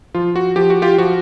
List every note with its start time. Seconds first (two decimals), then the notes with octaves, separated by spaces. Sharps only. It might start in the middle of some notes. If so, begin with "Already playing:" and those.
0.14 F3 F4
0.36 F#4
0.56 F3 G4
0.70 F#4
0.82 F4 G4
0.98 F3 F#4